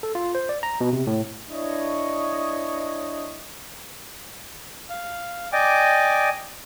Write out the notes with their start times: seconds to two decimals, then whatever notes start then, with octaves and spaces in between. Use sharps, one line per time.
0.03 A4
0.15 F4
0.35 C5
0.49 D5
0.63 A#5
0.81 B2
0.93 C3
1.07 A2
1.50 D4 E4 C#5 D#5
4.90 F5
5.52 D5 D#5 G5 G#5 D6